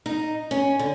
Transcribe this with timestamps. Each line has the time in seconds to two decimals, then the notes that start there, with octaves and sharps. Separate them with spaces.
0.06 D#4
0.51 C#4
0.79 D3